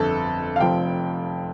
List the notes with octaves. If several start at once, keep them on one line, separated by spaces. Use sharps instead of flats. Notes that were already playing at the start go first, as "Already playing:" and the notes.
Already playing: G1 F2 D3 A4
F5
F1 F2 F3 G5